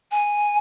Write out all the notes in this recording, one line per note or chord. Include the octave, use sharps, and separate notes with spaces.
G#5